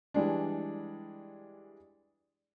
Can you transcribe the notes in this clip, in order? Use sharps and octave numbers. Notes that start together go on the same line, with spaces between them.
E3 G3 G#3 D4